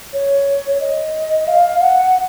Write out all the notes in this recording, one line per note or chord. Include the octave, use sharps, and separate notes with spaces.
C#5
D#5
F5
F#5